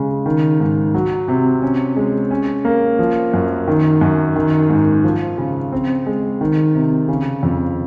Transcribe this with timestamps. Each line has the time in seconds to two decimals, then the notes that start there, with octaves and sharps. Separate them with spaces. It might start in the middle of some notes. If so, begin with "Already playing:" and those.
Already playing: C#3 G#3
0.26 D#3
0.60 G#2
0.94 F#3
1.28 C3
1.62 C#4
1.96 G#3
2.31 C#4
2.65 A#3
2.99 F3
3.34 F#2
3.68 D#3
4.01 F#2
4.36 D#3
4.70 G#2
5.04 F3
5.38 C#3
5.72 C4
6.06 G#3
6.41 D#3
6.75 C3
7.08 C#3
7.43 F2